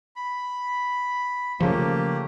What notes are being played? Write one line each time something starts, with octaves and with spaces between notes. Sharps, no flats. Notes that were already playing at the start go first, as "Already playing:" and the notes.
B5
C#3 F3 A3 A#3 G4